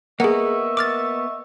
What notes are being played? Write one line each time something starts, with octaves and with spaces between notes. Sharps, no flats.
A#3 B3 G#4 D#5 E5 F#5 C#6
D6 F6 A6